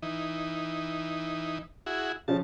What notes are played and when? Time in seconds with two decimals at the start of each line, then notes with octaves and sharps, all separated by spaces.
0.02 E3 D#4
1.86 E4 F#4 G#4
2.28 C#3 F3 C#4 A5